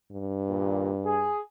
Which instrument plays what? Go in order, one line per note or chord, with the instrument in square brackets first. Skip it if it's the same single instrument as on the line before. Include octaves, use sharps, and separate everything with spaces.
[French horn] G2
[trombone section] D#2 A#2
G#4